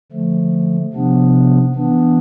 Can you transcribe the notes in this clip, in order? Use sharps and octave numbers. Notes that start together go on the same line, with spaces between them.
D3 F3 A3
C3 F3 B3 D4
E3 B3 D4